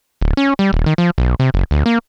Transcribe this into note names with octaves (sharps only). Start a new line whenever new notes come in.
D1
C#4
G3
D#1
D#3
F3
B1
C3
F#1
D2
A#3